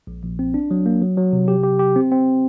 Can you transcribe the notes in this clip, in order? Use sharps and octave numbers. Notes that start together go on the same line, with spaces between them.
A#1
A#1
C4
D4
F#3
A#3
F#3
F#3
C3
G4
G4
G4
C4
C4